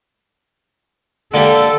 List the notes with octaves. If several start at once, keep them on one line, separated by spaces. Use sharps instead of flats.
D3 A#3 G4 A4